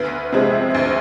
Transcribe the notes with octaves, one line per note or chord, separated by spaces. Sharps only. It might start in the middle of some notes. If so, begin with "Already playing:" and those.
Already playing: D2 B3 B4
C3 F3 G#3 C4
D2